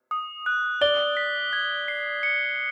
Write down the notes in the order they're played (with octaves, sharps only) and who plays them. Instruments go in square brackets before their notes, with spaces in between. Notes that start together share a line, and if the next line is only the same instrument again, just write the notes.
[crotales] D#6
F#6
[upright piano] D5 [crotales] G7
[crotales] B6
G#6
C7
C#7